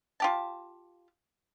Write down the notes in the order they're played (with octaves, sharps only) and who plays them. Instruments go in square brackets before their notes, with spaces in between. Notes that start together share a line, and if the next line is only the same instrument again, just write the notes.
[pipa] F4 G4 A5